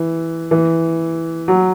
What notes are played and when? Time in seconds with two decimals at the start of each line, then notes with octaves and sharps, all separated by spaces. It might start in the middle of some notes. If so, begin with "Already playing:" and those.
Already playing: E3
0.51 E3
1.48 F#3